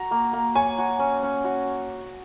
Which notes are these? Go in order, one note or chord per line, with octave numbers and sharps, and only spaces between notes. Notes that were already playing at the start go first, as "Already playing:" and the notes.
Already playing: F#4 A#5
A#3
A#3
C#5 G#5
F#4
C#4
C#4
F#4